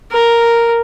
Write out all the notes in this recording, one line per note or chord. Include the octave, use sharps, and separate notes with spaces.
A#4